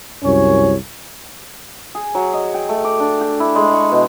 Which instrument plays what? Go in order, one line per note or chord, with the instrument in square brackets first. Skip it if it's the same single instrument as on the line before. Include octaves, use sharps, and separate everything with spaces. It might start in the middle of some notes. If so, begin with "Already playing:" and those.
[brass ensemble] C2 F#2 C#4 C#5
[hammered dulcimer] G#4
F#3
D#5
G5
A3
D6
D4
G4
E4
G#3
C#6
B2